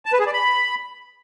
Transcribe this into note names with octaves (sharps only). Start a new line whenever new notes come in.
A5
B4
G#4
D5
B5